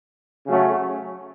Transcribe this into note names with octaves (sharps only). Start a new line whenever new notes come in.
C#3 F#3 A3 C#4